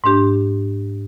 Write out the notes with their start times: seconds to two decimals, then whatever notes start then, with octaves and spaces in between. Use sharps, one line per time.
0.04 G#2 A3 D4 G4